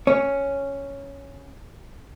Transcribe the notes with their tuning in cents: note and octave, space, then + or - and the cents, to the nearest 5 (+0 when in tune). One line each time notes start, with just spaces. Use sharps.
C#4 +0 C#5 +0